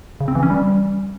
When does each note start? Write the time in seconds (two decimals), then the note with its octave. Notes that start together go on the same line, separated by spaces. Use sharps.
0.21 C#3
0.28 C4
0.35 E3
0.43 C#4
0.50 G3